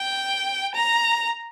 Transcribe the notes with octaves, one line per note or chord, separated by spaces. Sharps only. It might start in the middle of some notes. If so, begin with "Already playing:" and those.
Already playing: G5
A#5